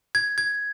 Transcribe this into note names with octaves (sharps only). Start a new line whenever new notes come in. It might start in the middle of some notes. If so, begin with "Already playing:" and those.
G#6
G#6